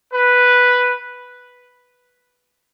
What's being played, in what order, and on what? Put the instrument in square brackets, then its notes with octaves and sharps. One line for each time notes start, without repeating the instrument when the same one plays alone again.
[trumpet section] B4